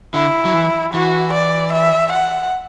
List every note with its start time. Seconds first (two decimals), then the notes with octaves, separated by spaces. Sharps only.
0.14 D3 E4
0.45 F#3
0.54 E3
0.93 E3 F#4
1.33 D5
1.72 E5
2.12 F#5